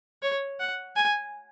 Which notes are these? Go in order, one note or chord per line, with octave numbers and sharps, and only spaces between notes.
C#5
F#5
G#5